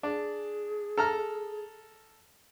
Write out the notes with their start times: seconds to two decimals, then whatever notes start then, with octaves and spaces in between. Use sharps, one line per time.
0.03 D4 G#4
0.98 A4 A#5 F6